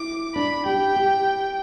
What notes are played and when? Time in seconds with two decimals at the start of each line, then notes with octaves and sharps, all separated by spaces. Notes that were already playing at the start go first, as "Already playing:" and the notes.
Already playing: E4 D6
0.35 D4 B5
0.66 G4 G5
0.96 G4